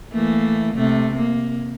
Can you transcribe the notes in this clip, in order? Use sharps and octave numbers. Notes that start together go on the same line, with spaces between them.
E3 A3 A#3
C3 A3
A#3